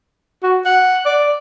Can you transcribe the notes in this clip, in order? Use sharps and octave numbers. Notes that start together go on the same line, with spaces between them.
F#4
F#5
D5